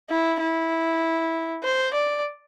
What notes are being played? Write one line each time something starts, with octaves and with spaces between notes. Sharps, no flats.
E4
E4
C5
D5